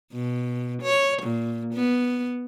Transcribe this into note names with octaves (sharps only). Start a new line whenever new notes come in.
B2
C#5
A#2
B3